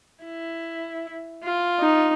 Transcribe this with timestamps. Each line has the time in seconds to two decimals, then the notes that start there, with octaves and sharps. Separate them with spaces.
0.24 E4
1.43 F4
1.80 D#4